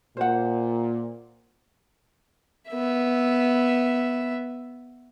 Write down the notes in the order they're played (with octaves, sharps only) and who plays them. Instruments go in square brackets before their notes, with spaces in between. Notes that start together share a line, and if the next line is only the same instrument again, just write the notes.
[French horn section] A#2 [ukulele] C5 F#5
[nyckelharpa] B3 E5